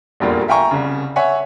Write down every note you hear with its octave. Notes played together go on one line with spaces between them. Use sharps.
F1 A#1 E2 G3 A#3 F4
E5 F5 G5 G#5 A#5 C#6
C2 C#3
C#5 E5 F#5 G#5